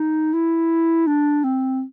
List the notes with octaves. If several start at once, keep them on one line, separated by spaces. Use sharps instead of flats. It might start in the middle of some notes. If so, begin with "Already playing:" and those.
Already playing: D#4
E4
D4
C4